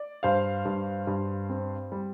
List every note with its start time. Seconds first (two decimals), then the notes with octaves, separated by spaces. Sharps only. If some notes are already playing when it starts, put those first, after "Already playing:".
Already playing: D5
0.23 G2 C5 F5
0.65 G2
1.07 G2
1.49 C4
1.92 G3